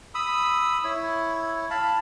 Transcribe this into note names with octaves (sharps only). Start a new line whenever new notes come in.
B5 D#6 E6
E4 C#5
F5 A5 B5